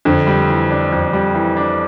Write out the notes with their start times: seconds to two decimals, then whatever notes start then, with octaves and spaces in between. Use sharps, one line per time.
0.05 F2 D3
0.27 G3
0.49 E3
0.70 D4
0.92 F2
1.13 G3
1.35 E3
1.57 D4